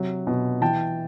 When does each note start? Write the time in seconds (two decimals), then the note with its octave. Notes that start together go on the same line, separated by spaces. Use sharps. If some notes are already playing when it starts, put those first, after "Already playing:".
Already playing: C3 F#3
0.27 B2
0.61 E3 G5 A5